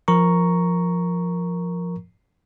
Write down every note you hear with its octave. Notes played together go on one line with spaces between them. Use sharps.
F3 A#4 A#5 C#6